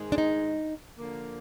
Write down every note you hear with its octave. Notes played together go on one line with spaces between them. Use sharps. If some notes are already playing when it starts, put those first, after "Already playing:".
Already playing: G#2 D#3 G#3
D4
D#4
D3 F3 A#3